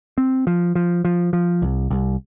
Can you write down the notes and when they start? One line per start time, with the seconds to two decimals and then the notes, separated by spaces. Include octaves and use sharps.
0.18 C4
0.47 F3
0.75 F3
1.05 F3
1.33 F3
1.62 C2
1.90 C2